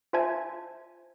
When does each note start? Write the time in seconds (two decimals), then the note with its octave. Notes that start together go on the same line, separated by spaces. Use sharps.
0.13 F4 C5 E5 G#5 A5 G#6